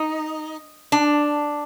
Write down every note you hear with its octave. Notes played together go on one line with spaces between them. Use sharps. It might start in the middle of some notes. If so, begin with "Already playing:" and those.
Already playing: D#4
D4